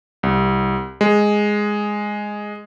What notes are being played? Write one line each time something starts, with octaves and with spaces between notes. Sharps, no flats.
C2
G#3